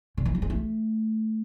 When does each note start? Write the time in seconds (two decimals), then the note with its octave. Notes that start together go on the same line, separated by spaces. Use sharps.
0.17 D3
0.25 E3
0.35 F#3
0.42 G#3
0.50 A3